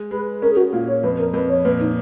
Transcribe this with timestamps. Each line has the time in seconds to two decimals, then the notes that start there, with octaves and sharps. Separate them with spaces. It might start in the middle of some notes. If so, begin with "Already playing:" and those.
Already playing: G#3
0.11 G#3 B4
0.42 C#4 A#4
0.52 G#4
0.57 F#4
0.73 A#2 F4
0.88 C#5
1.03 F2 B4
1.19 A#4
1.33 F2 B4
1.49 C#5
1.65 A#2 B4
1.80 D#4